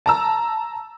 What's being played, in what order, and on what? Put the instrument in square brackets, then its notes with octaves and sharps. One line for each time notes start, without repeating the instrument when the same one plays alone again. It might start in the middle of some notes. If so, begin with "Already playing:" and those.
[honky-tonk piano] A5 A#5 E6